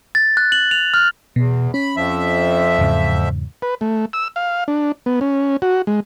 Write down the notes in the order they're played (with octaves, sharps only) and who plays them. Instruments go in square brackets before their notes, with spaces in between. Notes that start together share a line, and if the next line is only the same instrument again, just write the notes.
[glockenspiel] A6
F#6
F#7
F7
F6
[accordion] E2 [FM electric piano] B2
[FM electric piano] C#4 [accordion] B5
[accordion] F2 F3 E5
[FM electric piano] E2 G#2 C#3
[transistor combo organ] B4
A3
E6
F5
D4
B3
C#4
F#4
G#3